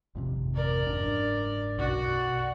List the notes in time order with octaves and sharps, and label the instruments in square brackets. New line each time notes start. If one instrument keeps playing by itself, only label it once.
[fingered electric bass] G#1 F2 C3
[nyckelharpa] A#4 D5
[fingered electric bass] F#1 G#2 D4
[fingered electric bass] B1 F#2 B2 [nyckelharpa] F#4 D5